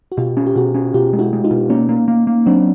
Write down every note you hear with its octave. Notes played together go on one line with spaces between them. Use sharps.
F#4
B2 F4 G4
C#4
G4
B2 F#4 G#4
C#4
B2 F4 G4
G#3
E4 F#4
G#3
D#4 F4
B2
A#3 C#4 D#4
A#3
A#3
A#3
F#3 C4 D4